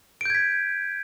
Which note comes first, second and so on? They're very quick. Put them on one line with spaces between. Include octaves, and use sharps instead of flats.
D7 G6 G#6 B6